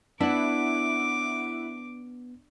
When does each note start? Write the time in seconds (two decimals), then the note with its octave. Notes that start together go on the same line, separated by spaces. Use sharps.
0.21 B3 D4 E4 E5 F#5 D6